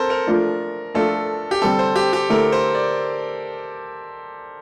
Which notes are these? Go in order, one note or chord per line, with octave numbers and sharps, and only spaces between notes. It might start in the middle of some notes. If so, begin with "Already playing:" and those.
Already playing: C4 A4 A#4 C5
A#4
F3 A3 D4 F4
F3 A3 D4 F4 A4
G4
D3 G3 C4 A4
C5
G4
G4
D3 A3 E4 A#4
C5
D5